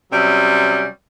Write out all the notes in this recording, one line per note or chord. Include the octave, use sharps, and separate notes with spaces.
C3 F#3 G3 C#4